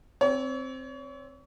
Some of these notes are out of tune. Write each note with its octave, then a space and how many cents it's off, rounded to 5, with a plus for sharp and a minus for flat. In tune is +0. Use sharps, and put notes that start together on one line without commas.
C4 +0 C#5 +35